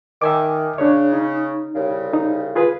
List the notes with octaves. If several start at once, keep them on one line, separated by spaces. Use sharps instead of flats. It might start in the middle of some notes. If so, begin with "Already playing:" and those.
D#3 E5 G#5 D6
C#3 D4 C#5
D#4
C2 C#3
D#4
F4 G#4 B4